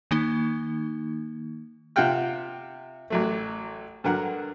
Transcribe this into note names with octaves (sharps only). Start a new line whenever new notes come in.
D#3 A#3 D#4
C3 F4 G4 F#5 G5 F6
A1 F#3 A3
G2 D3 F#3 A#4 F#5